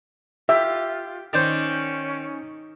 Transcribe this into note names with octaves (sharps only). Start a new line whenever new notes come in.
F4 G4 E5
D#3 C#4 C5 D5